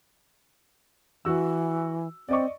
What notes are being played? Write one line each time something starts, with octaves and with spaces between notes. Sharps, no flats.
E3 F#4 E6
C4 D5 D#5 C#6